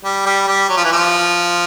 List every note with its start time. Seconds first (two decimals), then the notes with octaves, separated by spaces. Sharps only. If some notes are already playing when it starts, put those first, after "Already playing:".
0.04 G3
0.26 G3
0.47 G3
0.69 F#3
0.76 F3
0.84 E3
0.92 F3